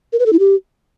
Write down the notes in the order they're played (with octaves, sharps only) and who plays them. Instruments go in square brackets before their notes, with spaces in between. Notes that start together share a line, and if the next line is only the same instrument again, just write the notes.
[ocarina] A#4
B4
A4
E4
G4